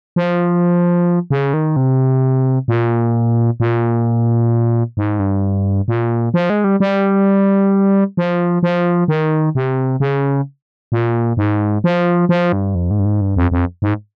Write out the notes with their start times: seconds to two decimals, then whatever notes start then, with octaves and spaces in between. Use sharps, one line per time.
0.16 F3
1.30 C#3
1.54 D#3
1.76 C3
2.68 A#2
3.60 A#2
4.97 G#2
5.20 G2
5.88 A#2
6.34 F3
6.50 G#3
6.64 G3
6.80 G3
8.17 F3
8.63 F3
9.08 D#3
9.55 C3
10.00 C#3
10.92 A#2
11.37 G#2
11.84 F3
12.29 F3
12.52 G2
12.75 F2
12.91 G#2
12.99 G2
13.05 G#2
13.21 G2
13.36 F2
13.51 F2
13.82 G#2